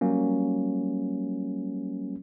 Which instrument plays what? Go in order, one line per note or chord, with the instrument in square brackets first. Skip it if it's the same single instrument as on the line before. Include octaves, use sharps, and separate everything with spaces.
[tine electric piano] F#3 G3 A#3 C#4